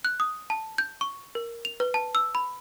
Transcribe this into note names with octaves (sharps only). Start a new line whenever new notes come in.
F#6
D#6
A5
G6
C#6
A#4
F7
B4
A5
E6
B5